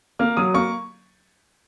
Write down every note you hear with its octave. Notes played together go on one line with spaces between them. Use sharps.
A#3 F6
F#3 D#6
A#3 C#6